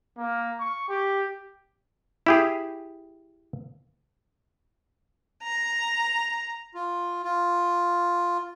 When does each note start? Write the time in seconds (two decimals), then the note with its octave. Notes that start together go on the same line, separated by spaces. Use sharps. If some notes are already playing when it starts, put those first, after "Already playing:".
0.18 A#3
0.60 C#6
0.89 G4
2.26 E4 G4 G#4
5.43 A#5
6.75 F4
7.23 F4